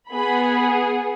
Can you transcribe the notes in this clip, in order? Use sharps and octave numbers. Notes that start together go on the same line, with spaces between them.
B3 G#4 B5